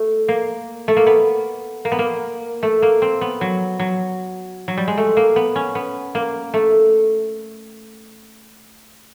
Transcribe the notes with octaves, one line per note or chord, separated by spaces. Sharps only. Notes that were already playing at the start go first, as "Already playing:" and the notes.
Already playing: A3
A#3
A3
A#3
B3
A#3
B3
A#3
A3
A#3
C4
B3
F#3
F#3
F#3
G3
G#3
A3
A#3
B3
C#4
B3
A#3
A3